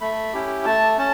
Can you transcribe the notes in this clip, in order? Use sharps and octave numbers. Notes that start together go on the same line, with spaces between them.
A3 B5
C#4 E4 G4
A3 A5
C#4 A5